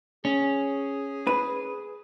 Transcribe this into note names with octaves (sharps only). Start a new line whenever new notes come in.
C#4 G#4
B4